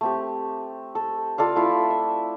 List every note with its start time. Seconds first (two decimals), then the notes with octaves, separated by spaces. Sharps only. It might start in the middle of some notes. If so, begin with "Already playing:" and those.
0.01 A3 C4 G4
0.95 A4
1.38 F4 A4 D5 F5
1.56 A3 E4 F4
1.90 E5